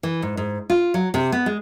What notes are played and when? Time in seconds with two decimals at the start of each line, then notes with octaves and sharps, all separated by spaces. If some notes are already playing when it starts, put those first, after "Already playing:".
0.03 E3
0.22 G#2
0.37 G#2
0.70 F4
0.94 F#3
1.14 C3
1.32 B3
1.46 G#3